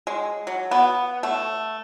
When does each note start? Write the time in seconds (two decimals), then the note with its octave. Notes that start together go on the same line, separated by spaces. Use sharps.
0.07 G#3
0.47 F#3
0.71 B3
1.23 A3